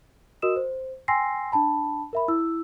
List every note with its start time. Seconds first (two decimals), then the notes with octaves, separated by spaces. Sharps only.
0.42 F#4 A#4 D#5 D#6 E6 E7
0.56 C5
1.08 G5 G#5 C6 E6 A#6 C7
1.52 D4 G5 A5 B5
2.13 A#4 E5 B5
2.28 E4 E6